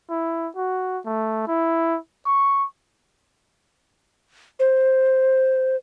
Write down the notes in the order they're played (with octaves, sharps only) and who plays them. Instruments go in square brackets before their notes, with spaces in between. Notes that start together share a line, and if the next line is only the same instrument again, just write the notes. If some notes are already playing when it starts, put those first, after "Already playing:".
[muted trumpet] E4
F#4
A3
E4
C#6
[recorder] C5